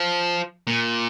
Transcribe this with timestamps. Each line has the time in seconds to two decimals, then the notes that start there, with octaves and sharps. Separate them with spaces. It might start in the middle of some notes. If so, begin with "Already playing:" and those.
Already playing: F3
0.67 A#2